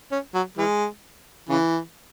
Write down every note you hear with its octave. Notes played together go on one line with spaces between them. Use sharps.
C#4
F#3
E3 G#3
C#3 E3